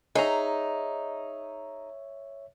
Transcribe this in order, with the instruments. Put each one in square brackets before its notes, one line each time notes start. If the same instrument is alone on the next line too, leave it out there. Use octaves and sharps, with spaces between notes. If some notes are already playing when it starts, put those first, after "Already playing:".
[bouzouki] D#4 [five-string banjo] G#4 A#5 [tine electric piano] C#5 E5